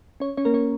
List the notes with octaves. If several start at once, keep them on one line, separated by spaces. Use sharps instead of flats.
C#4 C#5
C#4 C#5
A#3 A#4
C#4 C#5